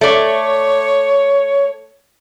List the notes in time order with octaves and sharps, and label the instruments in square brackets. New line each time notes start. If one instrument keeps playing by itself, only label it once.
[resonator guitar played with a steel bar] A3 D5 [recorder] C#5